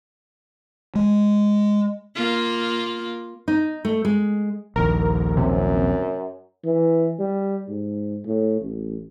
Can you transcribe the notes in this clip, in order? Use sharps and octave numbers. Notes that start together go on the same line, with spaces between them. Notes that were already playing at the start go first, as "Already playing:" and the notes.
G#3
A#3 F4
D#4
A3
G#3
A#1 D#2 A#4
F#2 C3
E3
G3
G#2
A2
A1